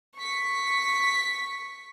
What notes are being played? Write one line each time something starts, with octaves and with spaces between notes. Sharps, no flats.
C#6 B6